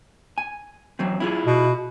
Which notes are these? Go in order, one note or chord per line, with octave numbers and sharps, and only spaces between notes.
G#5
E3 F#3 C4
E4 F4 G#4
B2